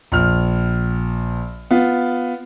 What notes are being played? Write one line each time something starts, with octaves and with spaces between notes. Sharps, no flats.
A#1 F6
B3 F4